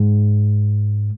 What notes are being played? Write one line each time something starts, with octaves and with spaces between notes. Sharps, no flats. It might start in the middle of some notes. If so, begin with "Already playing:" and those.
Already playing: G#2